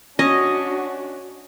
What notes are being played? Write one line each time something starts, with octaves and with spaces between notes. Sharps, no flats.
C#4 D4 F#4 D#5